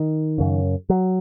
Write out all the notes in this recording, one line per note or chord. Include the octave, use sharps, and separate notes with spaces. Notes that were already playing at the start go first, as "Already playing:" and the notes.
Already playing: D#3
F#2 C#3
F#3